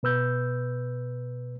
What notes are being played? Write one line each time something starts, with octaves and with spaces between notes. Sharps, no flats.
B2 B4 E6 G6